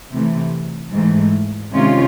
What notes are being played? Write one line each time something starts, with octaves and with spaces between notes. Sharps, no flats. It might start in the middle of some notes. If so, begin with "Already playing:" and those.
C3 E3 A3
G#2 E3 A3
C3 D#3 G#3 C#4 F4